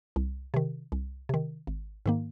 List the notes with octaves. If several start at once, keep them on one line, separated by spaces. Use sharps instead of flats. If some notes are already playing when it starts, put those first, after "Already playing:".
C2
C3 D#3
C2
C3 D#3
G#1
G#2 D#3 A#3